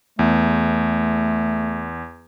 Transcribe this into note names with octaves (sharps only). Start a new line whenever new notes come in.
E2 A3